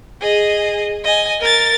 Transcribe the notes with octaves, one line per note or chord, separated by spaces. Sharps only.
G#4 D#5
D#5 G#5
A#4 A6